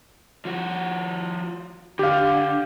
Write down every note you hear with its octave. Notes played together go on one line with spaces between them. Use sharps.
F3 F#4
D3 G4 F5